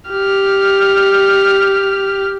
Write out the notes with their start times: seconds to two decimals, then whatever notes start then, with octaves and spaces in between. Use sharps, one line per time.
0.10 G4 F6